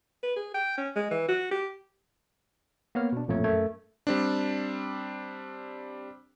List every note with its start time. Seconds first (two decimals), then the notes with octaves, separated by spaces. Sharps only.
0.23 B4
0.36 G#4
0.54 G5
0.77 C#4
0.96 G#3
1.11 E3
1.28 F#4
1.51 G4
2.95 A#3 B3 C#5 F6
3.12 B2 D4
3.28 A1 F2 A#2 A3 C#5
3.44 F#2 A3 A#4 E5 G#6
4.07 G3 C4 D4